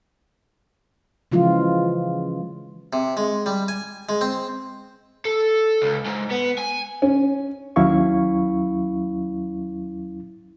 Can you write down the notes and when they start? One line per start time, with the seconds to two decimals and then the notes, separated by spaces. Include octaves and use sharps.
1.32 C#3 E3 F3 G#3 F4
2.93 C3
3.17 G#3
3.46 G3
3.68 G#5
4.09 G#3
4.21 C4
5.25 A4
5.82 C#2
6.06 G#2
6.31 B3
6.59 G#5
7.02 C#4
7.76 D#2 F#3 C#4 E4 F5 C#6